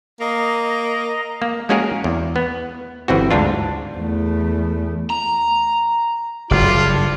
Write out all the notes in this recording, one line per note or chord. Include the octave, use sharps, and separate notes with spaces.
A#3 D#5 A#5
A#3
G#3 A#3 C#4 F#4 G#4 A#4
E2
B3
G1 E3 C4 F#4
D2 G#2 D4 F4
E2 A3
A#5
F#1 G2 F4 D5